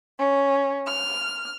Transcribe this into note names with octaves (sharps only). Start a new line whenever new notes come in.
C#4
F6